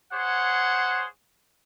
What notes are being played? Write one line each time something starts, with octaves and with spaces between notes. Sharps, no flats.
G#4 C5 C#5 F#5